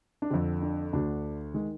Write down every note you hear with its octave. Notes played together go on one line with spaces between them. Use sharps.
D4
F2 D3 C4
D4
D2 D3 D4
D#3 G#3